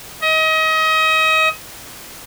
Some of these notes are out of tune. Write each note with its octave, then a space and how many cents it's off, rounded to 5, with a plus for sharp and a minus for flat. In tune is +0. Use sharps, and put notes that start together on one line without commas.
D#5 +30